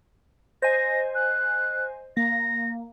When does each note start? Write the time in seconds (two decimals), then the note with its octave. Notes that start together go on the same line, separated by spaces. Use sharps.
0.62 C5 D#5 G#5 A#6
1.15 F#6
2.17 A#3 A#6